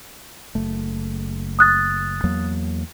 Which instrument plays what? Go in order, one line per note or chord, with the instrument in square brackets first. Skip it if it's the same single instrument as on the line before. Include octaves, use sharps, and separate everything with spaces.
[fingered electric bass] F#1 A3
[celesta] D#6 F#6 A6
[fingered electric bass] E2 F#3 A#3